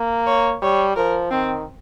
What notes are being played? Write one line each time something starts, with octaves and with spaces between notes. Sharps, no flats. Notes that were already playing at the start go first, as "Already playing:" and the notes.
Already playing: A#3
C#5
G3 C#5
F3 A#4
D#3 C4